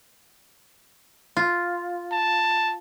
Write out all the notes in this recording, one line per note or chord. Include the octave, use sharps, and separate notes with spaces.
F4
A5